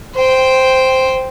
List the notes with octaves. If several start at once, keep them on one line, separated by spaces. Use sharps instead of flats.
C5 G5